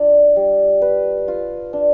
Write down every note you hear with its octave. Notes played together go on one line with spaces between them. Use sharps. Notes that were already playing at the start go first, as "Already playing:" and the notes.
Already playing: D4 F4
G3
B4
F4
D4